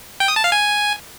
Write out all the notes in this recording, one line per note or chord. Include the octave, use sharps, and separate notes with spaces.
G5
D#6
A5
F5
G#5